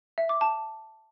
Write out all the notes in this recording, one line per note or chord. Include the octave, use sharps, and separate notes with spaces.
E5
D6
A5